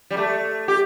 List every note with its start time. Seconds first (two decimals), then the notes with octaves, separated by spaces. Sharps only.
0.11 G3
0.17 A3
0.68 G4